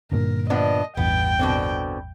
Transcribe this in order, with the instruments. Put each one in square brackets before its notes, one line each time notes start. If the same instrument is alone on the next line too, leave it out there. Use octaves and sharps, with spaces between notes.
[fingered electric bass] G2 A#2 D3 [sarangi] A#4
[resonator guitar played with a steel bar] F3 B3 D4 [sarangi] D#5
[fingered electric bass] A1 E2 G2 [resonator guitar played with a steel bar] B3 [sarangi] G5
[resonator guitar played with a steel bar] B2 D3 C4